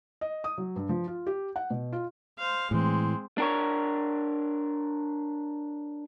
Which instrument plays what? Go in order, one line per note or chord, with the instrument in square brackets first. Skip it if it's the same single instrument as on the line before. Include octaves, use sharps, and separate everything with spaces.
[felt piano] D#5
D#6
F#3
G2
F3
F4
G4
F#5
B2
F4
[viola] C5 F5
[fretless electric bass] A2 E3 [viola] G#3 C4
[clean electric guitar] D4 A#4 C#5